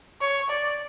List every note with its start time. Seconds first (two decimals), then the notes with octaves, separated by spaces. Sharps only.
0.21 C#5
0.49 D5